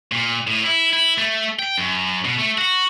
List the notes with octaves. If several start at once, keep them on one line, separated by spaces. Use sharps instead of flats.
A#2
A2
E4
E4
A3
G5
F#2
B2
A3
F#4